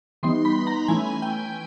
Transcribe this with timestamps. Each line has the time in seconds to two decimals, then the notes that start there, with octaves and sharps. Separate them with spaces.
0.23 E3 G3 B3 D#4 C6
0.45 B5
0.67 A#5
0.88 E3 A3 C#4 E4 G#5
1.22 G5